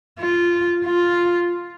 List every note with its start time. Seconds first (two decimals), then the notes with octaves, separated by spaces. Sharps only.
0.19 F4
0.85 F4